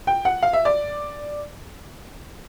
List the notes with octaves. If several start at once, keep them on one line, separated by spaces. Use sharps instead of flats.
G5
F#5
F5
E5
D5